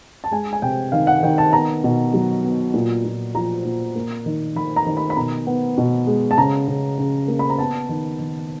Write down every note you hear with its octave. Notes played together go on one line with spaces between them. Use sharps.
A5
G#3 G#5
G#5
C3 G5
D#3 F5
F#5
D#3 G5
A5
B3 A#5
B2
F#3
B3
A#2
A#2
F3 A#5
A#2
A#3
D#3
D#3 B5
A#5
D#3
B5
B5
B2 A#5
B3
B2
G#3
A5
C#3 A#5
C#3
C#3
A#3
B5
A#5
B3 A5
D#3
D#3